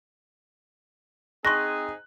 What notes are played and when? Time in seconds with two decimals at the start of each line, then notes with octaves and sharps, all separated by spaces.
1.45 C4 D#4 G#4 C6 C#6 F#6 A#6